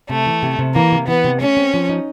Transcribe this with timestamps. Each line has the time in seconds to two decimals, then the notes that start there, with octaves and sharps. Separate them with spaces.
0.10 C3 A3
0.26 E3
0.43 C3
0.59 C3
0.75 E3 A#3
0.92 C3
1.08 E3 B3
1.24 C3
1.41 A3 C#4
1.57 C4
1.74 F3
1.89 D#4